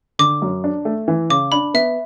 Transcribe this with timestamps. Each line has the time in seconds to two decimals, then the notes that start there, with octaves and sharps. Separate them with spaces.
0.19 D3 D6
0.42 F#2
0.64 D4
0.85 A3
1.08 E3
1.30 C#3 D6
1.52 D4 B5
1.74 B3 E5